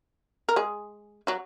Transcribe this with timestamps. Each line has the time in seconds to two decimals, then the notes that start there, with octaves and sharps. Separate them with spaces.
0.49 A#4
0.56 G#3 G#4
1.27 F#3 F#4